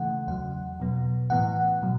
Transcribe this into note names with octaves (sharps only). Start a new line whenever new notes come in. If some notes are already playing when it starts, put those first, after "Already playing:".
Already playing: C#3 E3 A3 F#5
E2 C#3 F#3 F#5
B2 F#3 B3
A2 E3 B3 F#5
B2 F#3